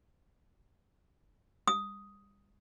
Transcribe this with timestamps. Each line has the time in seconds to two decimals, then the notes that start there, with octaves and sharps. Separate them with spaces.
1.68 D#6